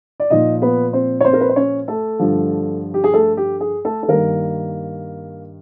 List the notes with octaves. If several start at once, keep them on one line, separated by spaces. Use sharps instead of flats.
D5
A#2 F3 D#4 D#5
B3 B4
C4 C5
C#5
C4 C5
A#4
B4
C5
C#4 C#5
A3 A4
G2 D3 F3
G4
G#4
A3 A4
G4
G#4
A3 A4
A4
G2 D#3 A#3 A#4